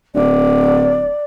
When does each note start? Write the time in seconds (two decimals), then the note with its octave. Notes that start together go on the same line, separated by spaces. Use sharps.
0.15 D1 D5